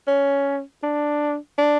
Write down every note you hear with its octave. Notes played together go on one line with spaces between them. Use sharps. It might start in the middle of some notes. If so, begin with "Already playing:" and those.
C#4
D4
D4